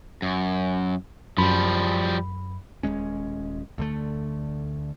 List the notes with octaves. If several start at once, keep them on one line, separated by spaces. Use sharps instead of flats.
F#2
F#2 F3 G3 B5
D#1 G#2 G#3 C#4
D2 D3 A3